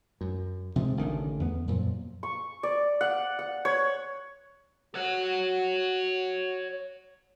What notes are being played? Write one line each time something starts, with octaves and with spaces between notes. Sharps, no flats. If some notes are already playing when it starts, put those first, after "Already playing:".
F#2
C3 F3 F#3 G#3
A1 D3 D#3
E2 B3
F#2 A#2 F3
C#6
D5
F#5
F#5
C#5
F#4 C#5 F#5